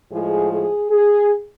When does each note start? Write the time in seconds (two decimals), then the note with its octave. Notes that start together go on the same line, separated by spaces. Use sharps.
0.11 A2 F3 G#3 G#4
0.51 G#4
0.90 G#4